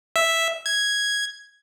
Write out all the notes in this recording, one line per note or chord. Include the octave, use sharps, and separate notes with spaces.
E5
G#6